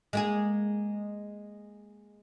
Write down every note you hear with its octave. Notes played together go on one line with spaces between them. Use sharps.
G#3 A#3 G#4